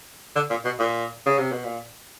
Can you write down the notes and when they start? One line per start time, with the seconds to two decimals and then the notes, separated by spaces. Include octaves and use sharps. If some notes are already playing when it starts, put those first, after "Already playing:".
0.35 D3
0.50 A#2
0.65 B2
0.79 A#2
1.26 C#3
1.39 C3
1.52 B2
1.64 A#2